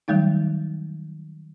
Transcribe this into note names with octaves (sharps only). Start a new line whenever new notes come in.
D#3 F#3 G3 A3 D#4